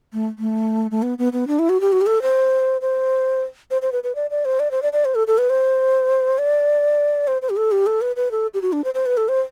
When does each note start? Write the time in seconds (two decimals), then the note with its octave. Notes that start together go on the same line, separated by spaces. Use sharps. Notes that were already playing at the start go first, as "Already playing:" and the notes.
0.13 A3
0.39 A3
0.91 A3
1.03 B3
1.18 B3
1.33 B3
1.47 D4
1.59 E4
1.69 F#4
1.81 G4
1.92 F#4
2.01 G4
2.06 A4
2.22 C5
2.81 C5
3.71 C5
3.82 C5
3.92 B4
4.04 B4
4.15 D5
4.30 D5
4.45 C5
4.60 D5
4.71 C5
4.82 D5
4.93 D5
5.05 C5
5.15 A4
5.27 A4
5.38 B4
5.50 C5
6.38 D5
7.27 C5
7.42 C5
7.50 G4
7.57 A4
7.72 G4
7.87 A4
8.01 B4
8.16 B4
8.31 A4
8.54 G4
8.62 F#4
8.73 D4
8.84 C5
8.94 C5
9.06 B4
9.17 A4
9.29 C5